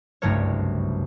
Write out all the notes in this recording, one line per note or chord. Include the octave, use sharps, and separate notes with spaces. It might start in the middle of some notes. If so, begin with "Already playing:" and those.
F#1 C2 G2 A3 A#4 C#5